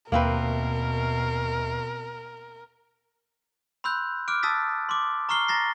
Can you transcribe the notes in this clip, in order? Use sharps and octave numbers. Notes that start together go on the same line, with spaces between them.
D#2 B2 A#3 C4 A#4 B4 E5 C7
B5 C6 E6 F#6 G6
D6 F6 F#6 D7
A5 D#6 E6 A6 B6
C6 D6
A#5 C#6 F6 C7 G7
A#5 A6 A#6 C7